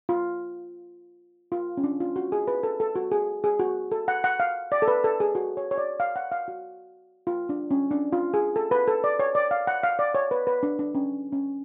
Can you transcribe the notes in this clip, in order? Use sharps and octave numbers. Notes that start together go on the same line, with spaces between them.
F4
F4
C#4
D4
F4
F#4
G#4
B4
A4
A4
F#4
G#4
G#4
F#4
A4
F#5
F#5
F5
D5
A4
B4
A4
G#4
F#4
C#5
C#5
D5
F5
F#5
F5
F#4
F4
D4
C#4
D4
F4
G#4
A4
B4
A4
D5
C#5
D5
F5
F#5
F5
D5
C#5
B4
B4
D4
D4
C#4
C#4